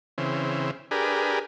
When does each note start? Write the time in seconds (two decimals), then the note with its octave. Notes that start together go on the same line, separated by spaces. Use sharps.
0.18 C#3 E3 C4
0.91 D4 G4 G#4 A#4 B4